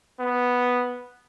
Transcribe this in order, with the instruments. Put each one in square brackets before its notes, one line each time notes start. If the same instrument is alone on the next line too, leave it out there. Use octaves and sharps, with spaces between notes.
[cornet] B3